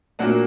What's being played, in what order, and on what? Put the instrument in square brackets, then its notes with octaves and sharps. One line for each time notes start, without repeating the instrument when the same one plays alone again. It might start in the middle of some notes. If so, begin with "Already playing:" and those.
[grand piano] A#2 F#3 A#3 D4 F#4